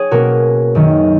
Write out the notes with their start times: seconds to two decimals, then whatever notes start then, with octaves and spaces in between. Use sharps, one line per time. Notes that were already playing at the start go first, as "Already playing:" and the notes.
Already playing: G#4 C#5
0.11 B2 A#3 C#4 F#4 A#4
0.75 F#2 D#3 A#3 C#4